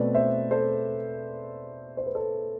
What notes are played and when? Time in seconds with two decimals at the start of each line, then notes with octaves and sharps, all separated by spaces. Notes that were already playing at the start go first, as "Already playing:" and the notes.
Already playing: B2 A3 C4 B4 D5
0.15 C5 E5
0.51 A4 C5
1.97 C5
2.06 B4
2.15 A4 C5